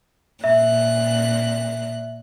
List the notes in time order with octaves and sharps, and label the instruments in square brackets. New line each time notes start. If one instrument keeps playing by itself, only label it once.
[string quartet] A#2 F#6 [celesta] E5